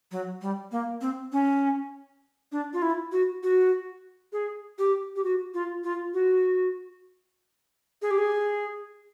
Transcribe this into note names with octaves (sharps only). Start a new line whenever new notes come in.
F#3
G3
A#3
C4
C#4
D4
F4
E4
F#4
F#4
G#4
G4
G4
F#4
F4
F4
F#4
G#4
G4
G#4